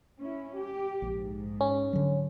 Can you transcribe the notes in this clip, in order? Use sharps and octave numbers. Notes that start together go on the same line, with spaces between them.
C#4 E4
G4
A#1 G#2
C#4
D3 F#3